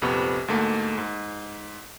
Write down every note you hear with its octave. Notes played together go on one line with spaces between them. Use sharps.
A#1 F2 C3 B3 C#6
D2 G#2 A3 A#3
G#2